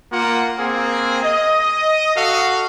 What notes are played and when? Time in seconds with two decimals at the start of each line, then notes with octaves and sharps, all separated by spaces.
0.11 A#3 F4 F#5
0.59 A#3 C4 G#4
1.23 D#5
2.16 F#4 A4 F5